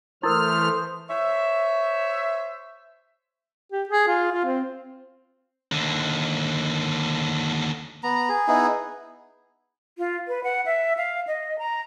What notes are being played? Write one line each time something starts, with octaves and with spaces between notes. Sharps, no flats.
E3 A3 E4 A#4 C5 D#6 F6
C5 C#5 E5
G4
G#4
F4
F4
C4
D#2 D3
B3 A#5
G#4
B3 D#4 E4 G#4
F4
B4
F#5
E5
F5
D#5
A#5